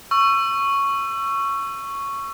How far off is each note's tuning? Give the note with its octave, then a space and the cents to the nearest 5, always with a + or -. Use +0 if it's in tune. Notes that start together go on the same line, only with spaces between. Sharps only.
C#6 +0 E6 +30